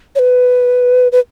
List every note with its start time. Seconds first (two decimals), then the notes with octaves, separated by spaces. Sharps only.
0.15 C#5
0.19 B4
1.12 B4